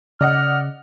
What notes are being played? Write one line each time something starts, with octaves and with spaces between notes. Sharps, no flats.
C#3 D5 D#5 F#5 F6